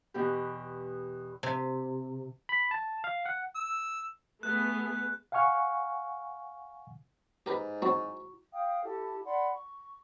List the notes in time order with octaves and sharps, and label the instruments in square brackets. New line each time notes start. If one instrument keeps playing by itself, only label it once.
[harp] E2 B2 G4
[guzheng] C3
[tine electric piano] B5
A5
F5
F#5
[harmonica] E6
[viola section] A3 B3 G#4 [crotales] F#6
[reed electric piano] F5 F#5 G#5 C#6 F6
[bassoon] G#2 [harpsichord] G4 A#4 B4
[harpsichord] F#3 C4 [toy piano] E4 F#4 C#6
[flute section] F5 G5 D#6
E4 G4 A4 A5
D5 F#5 B5 C6
C#6